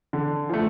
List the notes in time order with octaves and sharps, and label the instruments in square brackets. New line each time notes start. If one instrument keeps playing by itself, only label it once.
[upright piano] D3
F3 A3